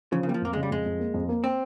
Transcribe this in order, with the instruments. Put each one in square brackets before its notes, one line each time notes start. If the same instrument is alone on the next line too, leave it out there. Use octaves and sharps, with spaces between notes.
[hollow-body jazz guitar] C#3 [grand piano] F3
[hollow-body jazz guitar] C#3
[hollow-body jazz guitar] G3 [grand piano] A#3
[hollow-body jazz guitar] F3
[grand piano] F2 [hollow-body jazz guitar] A#3
[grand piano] C#3 [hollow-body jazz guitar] G#3
[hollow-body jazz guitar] G3
[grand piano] F2 [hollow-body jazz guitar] G#3
[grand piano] F2
A#3
F2
A#3
[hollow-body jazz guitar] C4